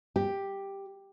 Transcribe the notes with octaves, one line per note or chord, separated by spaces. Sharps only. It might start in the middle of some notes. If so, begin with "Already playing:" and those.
G4